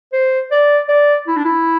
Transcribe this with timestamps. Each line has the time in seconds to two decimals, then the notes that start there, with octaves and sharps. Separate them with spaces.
0.13 C5
0.51 D5
0.88 D5
1.27 E4
1.36 D4
1.45 E4